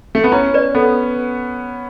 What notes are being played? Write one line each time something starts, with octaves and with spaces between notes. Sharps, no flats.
A3
B3
C#4 E4
B4 D5
B3 A4